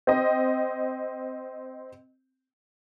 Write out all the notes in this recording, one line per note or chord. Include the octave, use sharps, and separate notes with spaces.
C4 D#5